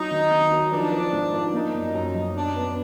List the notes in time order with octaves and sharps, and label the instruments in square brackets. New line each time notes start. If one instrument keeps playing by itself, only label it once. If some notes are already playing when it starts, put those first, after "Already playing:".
Already playing: [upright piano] F#3 [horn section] D#4
[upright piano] D#3
D#3
F#3
[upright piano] F3 [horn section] D4
[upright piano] F3
G#2
F3
[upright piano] A#3 [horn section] D#4
[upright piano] F#2
F#2
F#2
[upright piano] B2 [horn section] D4
[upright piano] B3